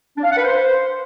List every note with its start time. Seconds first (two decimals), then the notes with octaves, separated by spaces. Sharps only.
0.17 D4
0.24 F5
0.30 F#5
0.37 B4
0.44 C5